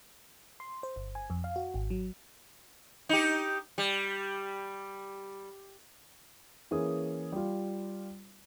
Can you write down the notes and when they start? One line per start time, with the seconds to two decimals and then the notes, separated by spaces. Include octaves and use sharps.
0.60 C6
0.83 C5
0.96 G1
1.15 G#5
1.30 F2
1.44 F5
1.56 F#4
1.74 G#1
1.90 F#3
3.09 D#4 G4
3.78 G3
6.71 E3 A#3 C#4 G#4 B4 D#6
7.32 G3 F4